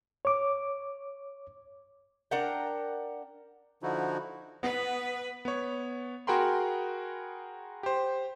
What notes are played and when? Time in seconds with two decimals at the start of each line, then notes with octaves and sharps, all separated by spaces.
0.25 C#5 D6
2.31 D4 A#4 F#5 G5
3.83 D3 F3 D#4 E4 F#4
4.63 B3 B4
5.45 B3 C#5
6.27 F#4 G#4 A#4 G5 B5 C6
7.83 G4 C5